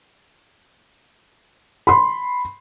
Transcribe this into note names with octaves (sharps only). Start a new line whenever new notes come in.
B5 C6